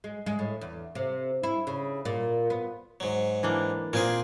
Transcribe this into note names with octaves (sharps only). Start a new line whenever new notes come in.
G#3
G#3
A2
E2
C3
E4
C#3
A#2
B3
G#2 F#3
E3 A#3 D4
A#2 A#3 C4 G#4